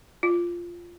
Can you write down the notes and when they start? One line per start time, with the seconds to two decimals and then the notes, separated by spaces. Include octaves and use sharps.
0.23 F4